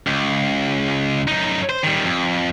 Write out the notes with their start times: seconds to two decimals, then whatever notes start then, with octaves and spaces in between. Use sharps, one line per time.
0.07 C#2
1.28 F#2 D#4
1.70 C5
1.84 D#3 G3
2.05 F2